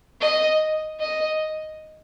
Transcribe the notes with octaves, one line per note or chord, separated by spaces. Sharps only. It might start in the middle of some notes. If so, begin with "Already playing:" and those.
D#5
D#5